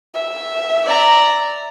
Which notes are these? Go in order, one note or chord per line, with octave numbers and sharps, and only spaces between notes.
E5
D5 A#5